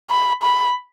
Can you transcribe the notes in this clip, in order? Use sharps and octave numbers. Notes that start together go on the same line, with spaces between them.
B5
B5